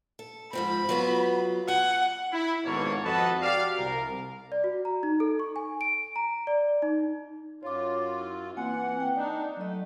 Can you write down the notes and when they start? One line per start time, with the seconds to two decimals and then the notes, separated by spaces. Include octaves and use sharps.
0.19 A4
0.53 G#2 F3 C4 B5
0.89 F#3 B3 F4
1.68 F#5 G#5
2.32 E4
2.65 G#1 C#2 B2 A#3 A4 C#5
3.05 F2 F#4 A4 B4 D#5 A5
3.42 F#4 G4 D5 F5
3.78 C2 A#4
4.52 D5
4.64 F#4
4.85 A#5
5.03 D#4
5.20 A4
5.39 C#6
5.56 G#5
5.81 D7
6.16 A#5
6.47 D5
6.82 D#4
7.63 F#2 F4 C#5 D6
8.21 E4
8.57 E3 A#3 C4 F#5 G#5
9.00 G5
9.16 D4 D#4 D5
9.57 F#3 A3 D#5